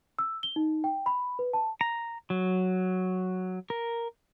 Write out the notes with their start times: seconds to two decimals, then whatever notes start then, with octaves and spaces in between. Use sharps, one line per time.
0.19 E6
0.43 G7
0.56 D#4
0.84 G5
1.06 B5
1.39 B4
1.53 A5
1.81 A#5
2.30 F#3
3.70 A#4